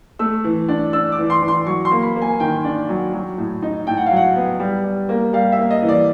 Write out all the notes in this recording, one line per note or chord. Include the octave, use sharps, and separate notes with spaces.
A3 E6
E3
D4
D4 E6
D6
E3
C6
E3
C6
F#3 C#6
C6
A#3
B5
A#3
G#5
D#3 G5
D4
F#3
F#3
A2
D#4
A2 G5
F#5
F5
F#3
F#5
B3
G3
G3
A#3
G3 F5
E5
A#3
D#5
E3
D5